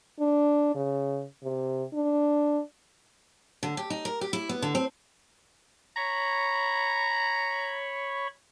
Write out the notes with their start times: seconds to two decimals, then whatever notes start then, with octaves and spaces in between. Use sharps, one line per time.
0.20 D4
0.75 C#3
1.44 C3
1.94 D4
3.63 D3
3.77 G4
3.90 D#4
4.05 A#4
4.21 G4
4.33 E4
4.49 B3
4.62 D3
4.75 C4
5.96 C#5 A#5 B5 C#6